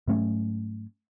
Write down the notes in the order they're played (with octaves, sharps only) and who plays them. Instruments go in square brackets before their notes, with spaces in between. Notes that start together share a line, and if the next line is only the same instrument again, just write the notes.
[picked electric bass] G#2 F#3 A3 C#4